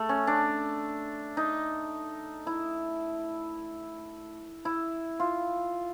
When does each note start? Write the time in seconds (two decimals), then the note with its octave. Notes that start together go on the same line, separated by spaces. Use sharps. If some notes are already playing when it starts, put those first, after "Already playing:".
Already playing: A3
0.09 C#4
0.27 D4
1.37 D#4
2.47 E4
4.65 E4
5.20 F4